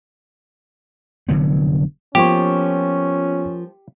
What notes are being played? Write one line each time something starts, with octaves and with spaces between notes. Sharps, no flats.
F1 D3 F#3 B3
F3 A#3 B3 C#4 F4 G4 C#6